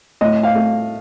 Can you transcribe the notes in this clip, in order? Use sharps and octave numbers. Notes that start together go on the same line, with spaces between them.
A2 D#5
F5
A3